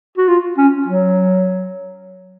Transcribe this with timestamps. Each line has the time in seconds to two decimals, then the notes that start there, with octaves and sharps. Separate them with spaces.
0.18 F#4
0.28 F4
0.58 C#4
0.88 F#3